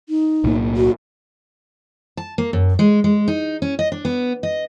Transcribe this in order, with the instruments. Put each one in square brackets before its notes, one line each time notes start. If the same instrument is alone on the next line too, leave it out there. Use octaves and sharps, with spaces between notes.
[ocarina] D#4
[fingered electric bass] B1 A2 A#3
[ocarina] F#4
[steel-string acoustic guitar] A5
A#3
F#2
G#3
G#3
D#4
C#4
D#5
D4
B3
D#5